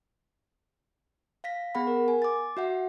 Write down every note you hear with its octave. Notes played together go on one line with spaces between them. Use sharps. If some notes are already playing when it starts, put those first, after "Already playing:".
F5 A#6 B6
B3 G#4 F#5 B5
A#4
G#5
D6 A6
F#4 E5 F#5